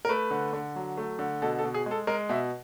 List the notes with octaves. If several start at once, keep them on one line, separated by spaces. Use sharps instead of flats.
A#4
A3 B4
D3
D3
F#3
A3
D3
B2 A4
A4
B2
G#4
G#3 A4
G#3 A#4
B2 E5